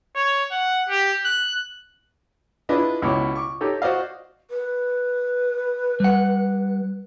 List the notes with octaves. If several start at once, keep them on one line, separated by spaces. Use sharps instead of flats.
C#5
F#5
G4
F#6
D4 E4 F4 G#4 B4 D#5
C#2 B2 E4 C#5 D6
C#6 D6
D#4 G4 A4 C#5
F#4 C5 D5 D#5 F5
B4
G3 F#5